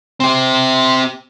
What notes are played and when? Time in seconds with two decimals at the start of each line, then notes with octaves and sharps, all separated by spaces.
0.20 C4 G4